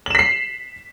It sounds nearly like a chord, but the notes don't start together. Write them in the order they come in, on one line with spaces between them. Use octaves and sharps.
F#7 E7 B6 C7